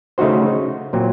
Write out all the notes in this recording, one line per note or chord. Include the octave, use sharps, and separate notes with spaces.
C#3 A3 D#4 F#4 C5
A#2 F#3 C4